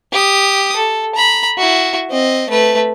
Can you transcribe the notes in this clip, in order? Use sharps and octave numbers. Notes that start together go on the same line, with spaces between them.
G4 D#6
A4
A#5 B5
E4 F#4
C4 D#5
A3 B4